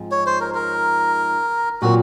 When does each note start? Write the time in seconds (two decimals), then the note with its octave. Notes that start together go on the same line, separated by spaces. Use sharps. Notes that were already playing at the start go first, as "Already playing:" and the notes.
Already playing: G#2 F3 C4
0.11 C#5
0.26 C5
0.41 A#4
0.54 A#4
1.82 A#2 F#3 C4 F4 F#4 A#4